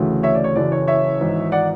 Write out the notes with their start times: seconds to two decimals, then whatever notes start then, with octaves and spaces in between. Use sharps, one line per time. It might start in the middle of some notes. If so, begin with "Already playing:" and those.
Already playing: D2 C#3 E3 A3
0.23 C#5 E5
0.35 D5
0.44 C#5
0.55 F#1 F#2 C#3 E3 D5
0.72 C#5
0.87 C#5 E5
1.20 G#1 G#2 E3
1.52 D5 F#5